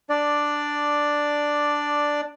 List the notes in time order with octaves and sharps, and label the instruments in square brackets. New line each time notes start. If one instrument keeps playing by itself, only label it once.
[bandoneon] D4 D5